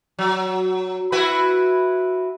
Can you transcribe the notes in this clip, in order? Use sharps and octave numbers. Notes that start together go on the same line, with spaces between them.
F#3
E4 F#4 B4